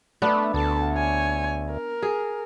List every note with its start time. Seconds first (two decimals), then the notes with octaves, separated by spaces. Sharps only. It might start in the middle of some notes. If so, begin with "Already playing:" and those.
0.22 A3 B3 D4
0.54 D2 A4 A5
0.93 C#5 G#5
1.71 A#4
2.02 G#4